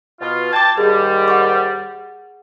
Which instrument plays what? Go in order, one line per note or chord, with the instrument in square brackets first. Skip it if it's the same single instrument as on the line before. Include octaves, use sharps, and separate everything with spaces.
[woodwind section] B2 F4
[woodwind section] G5 A5 [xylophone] D6 G#6
[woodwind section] D#2 G#2 G3 [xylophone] G#4
[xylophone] F#5 C#6 D6